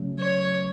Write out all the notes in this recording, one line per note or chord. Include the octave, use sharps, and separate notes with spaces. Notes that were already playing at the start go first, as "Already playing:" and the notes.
Already playing: C#3 F#3 A3 C#4
C#5